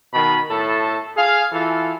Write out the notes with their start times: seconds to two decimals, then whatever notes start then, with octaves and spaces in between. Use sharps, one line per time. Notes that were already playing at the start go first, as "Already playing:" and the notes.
0.14 B2 D#3 B5
0.50 A2 A4
1.17 G#4 F5
1.53 E3 F4 A4